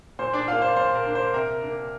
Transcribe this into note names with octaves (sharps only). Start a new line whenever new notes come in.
A#2 C5
D4 D5
A#3 D4 F4 F5
C5
A#2 C5
A#4
A#3 D4
C5
C3 A#4
A#3 D4